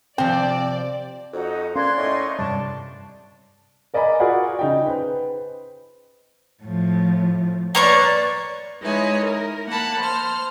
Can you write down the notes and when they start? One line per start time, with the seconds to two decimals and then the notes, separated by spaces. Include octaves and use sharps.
0.18 C3 F3 C4 D5 G5
1.33 F2 D#4 F#4
1.75 A#3 C#4 D5 C6 F#6 G#6
1.97 A2 D#4 D#5 C#6
2.39 G2 C3 G3 D4 A5
3.94 A#4 D5 D#5 G#5 A#5 B5
4.20 F4 F#4 G#4 A#4 D5 F#5
4.59 C#3 D#4 G#4 G5
4.86 B4 C5
6.63 A2 F3
7.75 A#3 B4 C#5 D5 C#6
8.81 G#3 D#4 E4 B4 C#5 G#5
9.20 A#4
9.67 A#3 F#5 A5 B5
10.01 C5 F6